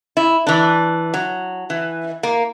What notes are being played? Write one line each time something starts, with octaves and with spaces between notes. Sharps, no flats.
E4
E3 D4
F#3
E3
A#3